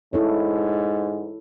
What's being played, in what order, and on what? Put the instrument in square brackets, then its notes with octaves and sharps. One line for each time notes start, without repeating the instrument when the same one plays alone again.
[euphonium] G#2 [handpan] E4 A4 C#5